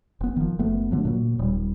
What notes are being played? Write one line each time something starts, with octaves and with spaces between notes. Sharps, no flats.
F1 B3
D#3 F3
F#1 A3 B3
D3 E3 F#3 A3
A#2 F#3
D#1 G3